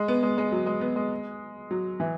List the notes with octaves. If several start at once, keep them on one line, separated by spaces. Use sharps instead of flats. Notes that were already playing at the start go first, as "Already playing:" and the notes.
Already playing: G#3
B3
G#3
G#3
F#3
G#3
B3
G#3
F#3
E3